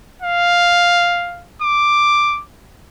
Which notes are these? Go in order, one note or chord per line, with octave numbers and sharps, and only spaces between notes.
F5
D6